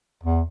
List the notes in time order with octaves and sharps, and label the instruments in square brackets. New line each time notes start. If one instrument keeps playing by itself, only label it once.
[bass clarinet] E2